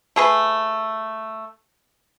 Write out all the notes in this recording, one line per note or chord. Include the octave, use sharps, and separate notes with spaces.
A3 G#4 B4